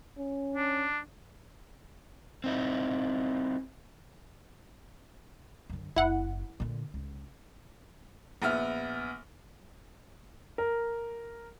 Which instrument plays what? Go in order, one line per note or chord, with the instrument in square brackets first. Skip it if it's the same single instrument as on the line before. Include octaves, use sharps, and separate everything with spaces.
[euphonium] C#4
[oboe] D4
[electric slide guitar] C4 D#4 E4
[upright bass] F#2 D3
[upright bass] F#1 [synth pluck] E4 F#5
[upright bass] A#2 D3
C#2
[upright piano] A#1 B3 E5 F6
[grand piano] A#4